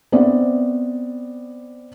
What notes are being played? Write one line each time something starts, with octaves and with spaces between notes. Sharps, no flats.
B3 C4 D5 E5